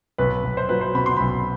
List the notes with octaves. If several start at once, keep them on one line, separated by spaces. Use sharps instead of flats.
B1 B4
B1
C5
F#3 B4
C5
B2 B5
C6
B1 B5